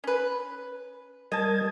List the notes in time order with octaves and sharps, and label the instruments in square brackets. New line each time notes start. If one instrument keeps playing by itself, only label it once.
[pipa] C#4 B4
[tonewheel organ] G3 A#4 G#6 [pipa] D#5 A5